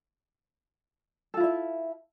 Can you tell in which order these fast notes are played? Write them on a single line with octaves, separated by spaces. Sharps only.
A4 F4 E4 E5